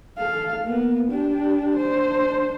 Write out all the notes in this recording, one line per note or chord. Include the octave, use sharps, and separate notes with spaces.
A4 F5
A#3 B3
D4 G4
D4 C5